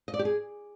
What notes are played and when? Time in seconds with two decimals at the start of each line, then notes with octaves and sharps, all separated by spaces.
0.08 D#5
0.14 D5
0.19 G4
0.25 G#4